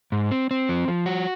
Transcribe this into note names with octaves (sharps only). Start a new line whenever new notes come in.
G#2
C4
C4
F3
F3
F#4